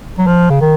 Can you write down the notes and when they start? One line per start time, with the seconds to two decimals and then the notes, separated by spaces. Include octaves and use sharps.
0.18 F#3
0.27 F3
0.50 C#3
0.61 D#3